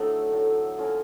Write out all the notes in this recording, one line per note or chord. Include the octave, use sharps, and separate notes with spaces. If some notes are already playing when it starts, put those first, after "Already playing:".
Already playing: A2 D3 F#3 A3 D#4
A2 F#3 A3
F3 A#3 C#4 F4